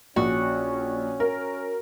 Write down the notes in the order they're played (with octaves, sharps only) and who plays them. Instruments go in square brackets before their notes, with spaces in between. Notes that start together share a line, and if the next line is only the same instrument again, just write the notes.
[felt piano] A#1 [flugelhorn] C#4 [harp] F#4
[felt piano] A#4